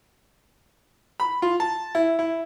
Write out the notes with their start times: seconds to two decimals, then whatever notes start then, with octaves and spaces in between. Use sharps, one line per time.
1.20 B5
1.42 F4
1.60 A5
1.95 E4
2.19 E4